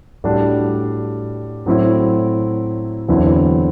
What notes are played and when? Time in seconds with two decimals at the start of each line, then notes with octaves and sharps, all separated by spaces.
0.24 A2 G3 D4 F#4
1.66 A2 F#3 C4 E4
3.08 E2 D3 F#3 C4 E4